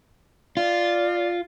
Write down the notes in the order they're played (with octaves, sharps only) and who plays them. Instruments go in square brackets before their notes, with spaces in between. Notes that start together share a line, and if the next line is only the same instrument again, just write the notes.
[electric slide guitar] F4 [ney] D5